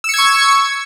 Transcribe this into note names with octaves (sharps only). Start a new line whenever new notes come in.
C#6 E6 G#6 C#7